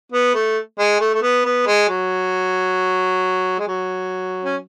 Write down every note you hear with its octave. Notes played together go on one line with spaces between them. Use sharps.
B3
A3
G#3
A3
A3
B3
B3
G#3
F#3
G#3
F#3
C#4